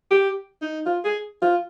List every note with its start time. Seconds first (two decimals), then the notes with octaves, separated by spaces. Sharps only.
0.11 G4
0.62 D#4
0.86 F4
1.05 G#4
1.42 F4